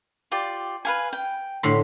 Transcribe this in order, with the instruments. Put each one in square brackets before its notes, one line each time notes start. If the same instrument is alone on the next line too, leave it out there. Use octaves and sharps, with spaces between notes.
[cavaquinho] F4 G4 D5
B4 F5 G#5
G5
[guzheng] A2 D3 B5 [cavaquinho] C6